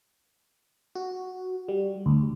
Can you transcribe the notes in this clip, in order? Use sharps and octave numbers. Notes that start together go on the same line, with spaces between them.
F#4
G3
D2